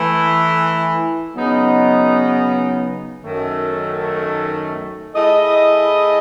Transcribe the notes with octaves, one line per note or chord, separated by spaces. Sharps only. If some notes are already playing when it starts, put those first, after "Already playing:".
Already playing: E3 A3 E4
C#3 F#3 B3 D#4
F#2 D#3 A3
A3 E4 G#4 D#5